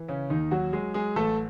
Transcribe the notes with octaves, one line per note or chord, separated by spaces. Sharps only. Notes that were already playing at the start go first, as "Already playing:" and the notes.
Already playing: E3
C#3 C#4
D#2 D#3 D#4
F#3 F#4
F#3 G#3 G#4
G#3 G#4
A1 A3 A4